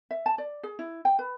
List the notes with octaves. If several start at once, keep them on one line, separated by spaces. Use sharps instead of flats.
E5
A5
D5
G#4
E4
G5
B4